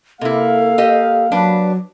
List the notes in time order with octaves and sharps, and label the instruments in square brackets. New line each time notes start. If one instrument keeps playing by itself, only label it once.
[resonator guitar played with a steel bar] C3 E4 [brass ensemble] A#3 F5 [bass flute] A4
[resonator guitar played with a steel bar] G4 D#5
[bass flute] F#3 [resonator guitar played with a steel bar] D4 B4